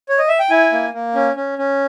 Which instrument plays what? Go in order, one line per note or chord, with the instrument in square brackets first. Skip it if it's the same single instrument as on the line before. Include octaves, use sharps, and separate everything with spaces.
[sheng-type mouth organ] C#5
D#5
E5
G5
E4 G#5
A#3
A#3
C#4
C#4
C#4